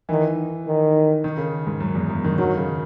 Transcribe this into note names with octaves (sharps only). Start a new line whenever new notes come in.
D#3 E3
D#3
D#3
C#3
G#2
F#2
E2
F#2
D#3
D#3 F#3
C#3